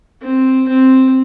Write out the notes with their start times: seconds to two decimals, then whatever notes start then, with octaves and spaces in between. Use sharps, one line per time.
0.22 C4
0.68 C4